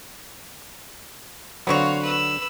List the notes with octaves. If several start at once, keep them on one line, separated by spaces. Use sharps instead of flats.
D3 F#3 B3 C4 F#4 C#5 F5
B4 E6